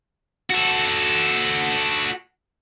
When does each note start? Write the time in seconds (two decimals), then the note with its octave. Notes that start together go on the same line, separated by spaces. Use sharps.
0.50 F#4 A4